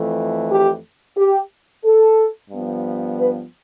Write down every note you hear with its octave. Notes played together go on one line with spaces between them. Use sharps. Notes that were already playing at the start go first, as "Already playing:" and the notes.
Already playing: F2 E3 A3
G4
G4
A4
G2 F3 B3
B4